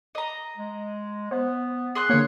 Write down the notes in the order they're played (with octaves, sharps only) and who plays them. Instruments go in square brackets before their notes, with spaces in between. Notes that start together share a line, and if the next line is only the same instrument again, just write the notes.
[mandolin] D#5 A#5
[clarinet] G#3
[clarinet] B3 [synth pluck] C5
[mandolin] G#4 C6 F#6
[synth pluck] D3 A#3 [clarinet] C#5